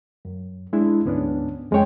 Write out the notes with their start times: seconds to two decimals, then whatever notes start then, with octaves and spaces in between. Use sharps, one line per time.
0.25 F#2
0.73 G#3 D4 E4
1.05 D2 G#2 B3 C#4 D4
1.71 F2 G#3 C#4 C#5 G5